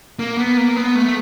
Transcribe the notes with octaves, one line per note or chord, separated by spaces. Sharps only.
A#3
B3
A#3
B3
A3